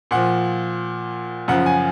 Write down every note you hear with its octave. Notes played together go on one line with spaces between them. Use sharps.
A#2 F3 F#5
F#2 C#3 F3 F#5
G#5